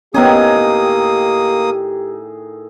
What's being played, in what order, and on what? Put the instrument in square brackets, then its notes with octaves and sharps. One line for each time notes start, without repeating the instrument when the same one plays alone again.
[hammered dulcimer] A2 D#3 G#4 [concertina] A#3 D#6 [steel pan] B3 C#4 [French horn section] G4